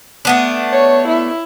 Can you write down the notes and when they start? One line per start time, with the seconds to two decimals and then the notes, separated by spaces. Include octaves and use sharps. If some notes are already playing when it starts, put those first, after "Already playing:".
0.25 A3 B3 D4
0.72 C#5
1.08 E4